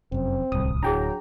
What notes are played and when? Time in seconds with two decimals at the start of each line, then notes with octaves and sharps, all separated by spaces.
0.12 F1 F#2 C4
0.52 D1 C2 D#6
0.83 F#3 D4 E4 G#4 G5 A#5